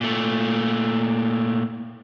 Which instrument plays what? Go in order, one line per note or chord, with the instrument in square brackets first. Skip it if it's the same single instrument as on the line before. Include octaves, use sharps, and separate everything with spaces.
[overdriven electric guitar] A#2 A3